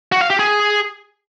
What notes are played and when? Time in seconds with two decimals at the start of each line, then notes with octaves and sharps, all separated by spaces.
0.12 F#4
0.21 F5
0.30 G4
0.39 G#4